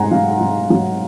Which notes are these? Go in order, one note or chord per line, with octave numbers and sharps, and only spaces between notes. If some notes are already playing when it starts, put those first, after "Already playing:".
Already playing: G#2 F#5 G#5 A#5 C6
F#3 F5
F#3
F#3